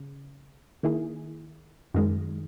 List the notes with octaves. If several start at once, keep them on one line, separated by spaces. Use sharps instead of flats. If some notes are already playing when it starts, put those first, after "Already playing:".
Already playing: C#3
D#3 A#3 E4 G#4
F#2 D#3 G#3